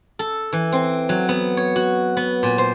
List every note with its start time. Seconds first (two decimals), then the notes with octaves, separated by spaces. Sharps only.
0.19 A4
0.53 E3
0.72 C4
1.09 F#3
1.29 B3
1.57 C#5
1.76 F#4
2.17 B3
2.43 A#2
2.58 C5